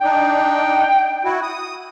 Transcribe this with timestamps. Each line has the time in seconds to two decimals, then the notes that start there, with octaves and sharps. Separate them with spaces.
0.01 D4 D#4 G5
1.24 E4 F#4
1.42 D#6